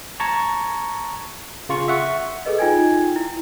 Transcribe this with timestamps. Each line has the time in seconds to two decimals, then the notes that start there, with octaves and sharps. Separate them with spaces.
0.20 A5 A#5 C#6 G#6
1.69 C#3 F4 C#6
1.88 E5 F#5 C#6
2.45 G#4 A4 B4 D#5
2.58 D#4 F4 G5 G#5 G#6
3.16 E4